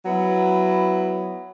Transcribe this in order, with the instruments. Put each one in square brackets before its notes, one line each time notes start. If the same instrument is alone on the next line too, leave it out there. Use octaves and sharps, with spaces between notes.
[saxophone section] F#3 B3 E4